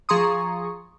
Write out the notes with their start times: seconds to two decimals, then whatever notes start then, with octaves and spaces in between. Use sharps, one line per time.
0.09 F3 G#4 A#5 C6 C#6 D#6